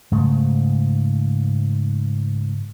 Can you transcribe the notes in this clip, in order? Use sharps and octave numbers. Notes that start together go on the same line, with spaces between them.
G#2 C#3 A3